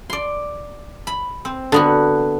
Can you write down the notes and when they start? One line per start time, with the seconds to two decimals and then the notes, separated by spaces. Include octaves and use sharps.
0.10 D5 C6
1.07 B5
1.45 C4
1.72 D3 B3 F#4